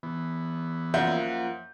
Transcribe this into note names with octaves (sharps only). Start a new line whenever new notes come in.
E3 B3
F#2 F3 A#3 F4 E5 F#5 G6